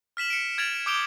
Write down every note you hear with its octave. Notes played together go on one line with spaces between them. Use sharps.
F6 B6 E7 F#7
C#7 D7
F6 G#6 A6 D7 F7 F#7
D7
D6 D#6 G6 D7 F7 G7